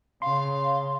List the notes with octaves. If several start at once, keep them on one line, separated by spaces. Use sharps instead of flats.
C#3 F5 C6